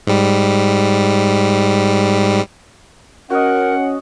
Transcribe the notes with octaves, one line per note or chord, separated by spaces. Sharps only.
G#2 G3
C#4 F#4 A#4 D#5 F#5